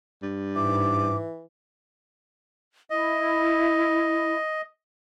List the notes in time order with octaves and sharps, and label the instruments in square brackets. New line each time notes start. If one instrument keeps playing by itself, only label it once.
[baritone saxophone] G2
[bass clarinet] G#2 [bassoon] E3 [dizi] D6
[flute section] E4 [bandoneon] D#5